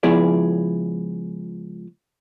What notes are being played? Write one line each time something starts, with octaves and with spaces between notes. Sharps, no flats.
C#2 F3 B3 E4 G#4 D5